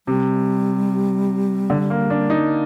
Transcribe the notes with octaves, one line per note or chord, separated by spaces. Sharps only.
C3 G3
D3
A#3
D4
D#4